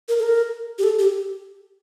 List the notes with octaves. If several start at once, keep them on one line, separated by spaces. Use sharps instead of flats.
A#4
A4
A#4
G4
A4
G4